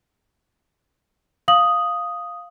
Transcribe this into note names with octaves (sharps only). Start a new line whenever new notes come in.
F5 D#6 F#7